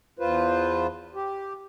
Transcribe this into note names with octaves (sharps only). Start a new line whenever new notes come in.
E2 F4 B4 C5
G4